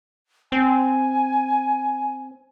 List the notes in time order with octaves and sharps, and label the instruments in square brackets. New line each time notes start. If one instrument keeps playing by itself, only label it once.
[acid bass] C4 [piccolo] G#5